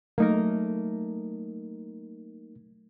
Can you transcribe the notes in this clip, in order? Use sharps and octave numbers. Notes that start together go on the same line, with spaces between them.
F#3 A3 A#3 D#4 A#4